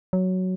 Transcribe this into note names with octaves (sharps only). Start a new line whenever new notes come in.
F#3